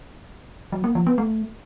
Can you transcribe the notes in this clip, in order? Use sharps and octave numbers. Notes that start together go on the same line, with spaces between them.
F#3
A#3
F3
B3
A3